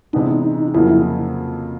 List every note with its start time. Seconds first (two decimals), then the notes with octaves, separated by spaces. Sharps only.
0.13 C3 E3 G#3 B3 D4 D#4
0.74 F2 C#3 F#3 A#3 E4